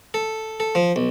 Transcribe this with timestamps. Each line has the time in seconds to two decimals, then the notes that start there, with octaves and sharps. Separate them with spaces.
0.14 A4
0.60 A4
0.75 F3
0.96 B1